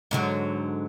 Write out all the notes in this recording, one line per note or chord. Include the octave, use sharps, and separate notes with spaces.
G#2 D3 F#3